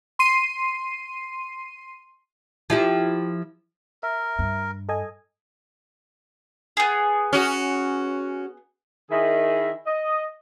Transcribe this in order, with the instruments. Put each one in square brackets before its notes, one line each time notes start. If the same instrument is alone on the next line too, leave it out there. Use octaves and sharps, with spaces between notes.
[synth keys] C6 C7 D#7
[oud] F3 E4 G4
[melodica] A#4 [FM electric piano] E5
[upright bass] G2
[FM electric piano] A4 D#5 G#5
[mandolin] B3 G#4
[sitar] C#4 F#4
[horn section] D#3 E4 G#4
D#5